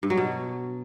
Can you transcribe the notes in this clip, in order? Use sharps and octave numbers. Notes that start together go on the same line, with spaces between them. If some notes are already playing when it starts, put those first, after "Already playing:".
G2
F#3
B2